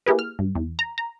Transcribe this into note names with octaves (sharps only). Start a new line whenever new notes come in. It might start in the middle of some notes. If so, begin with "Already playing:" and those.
A#3 E4 G4 G#4 B4
F6
G2
E2
A#5
A#5